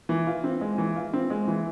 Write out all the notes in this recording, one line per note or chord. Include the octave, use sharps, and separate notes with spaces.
E3
F4
C4
G#3
E3
F4
C4
G#3
E3